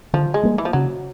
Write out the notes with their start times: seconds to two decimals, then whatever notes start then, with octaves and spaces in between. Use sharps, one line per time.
0.13 D3 F3
0.34 G#3
0.43 G3 A#3
0.58 E3
0.65 F3
0.73 C#3 F#3